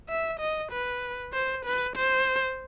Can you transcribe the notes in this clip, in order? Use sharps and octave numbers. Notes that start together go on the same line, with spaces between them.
E5
D#5
B4
C5
B4
C5